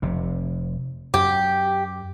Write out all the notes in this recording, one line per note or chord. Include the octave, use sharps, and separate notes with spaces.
F1 C3
F#2 G4